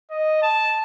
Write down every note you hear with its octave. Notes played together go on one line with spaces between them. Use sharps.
D#5
A5